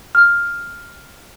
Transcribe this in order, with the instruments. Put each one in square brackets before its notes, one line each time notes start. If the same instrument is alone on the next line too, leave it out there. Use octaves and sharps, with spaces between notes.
[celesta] F6